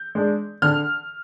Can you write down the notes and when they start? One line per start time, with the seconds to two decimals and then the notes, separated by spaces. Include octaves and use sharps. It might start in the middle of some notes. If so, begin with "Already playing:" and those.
Already playing: G6
0.15 G#3 D4
0.62 D3 F6